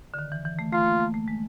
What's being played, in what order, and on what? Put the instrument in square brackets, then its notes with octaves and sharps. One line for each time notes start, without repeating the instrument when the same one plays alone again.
[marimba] D3
D#3
E3
E3
A3
[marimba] A3 [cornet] F4
[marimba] A#3
A3
A3
G#3